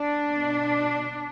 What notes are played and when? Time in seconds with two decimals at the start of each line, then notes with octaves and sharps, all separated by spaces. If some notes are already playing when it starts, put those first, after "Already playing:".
Already playing: D4
0.31 B2